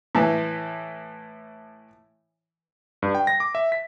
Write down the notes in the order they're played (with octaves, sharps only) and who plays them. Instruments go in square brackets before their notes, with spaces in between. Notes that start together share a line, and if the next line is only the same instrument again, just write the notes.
[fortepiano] A2 E3
[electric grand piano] G2
G5
A#6
D6
E5
B6